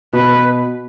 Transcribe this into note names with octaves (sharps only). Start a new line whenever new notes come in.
B2 B4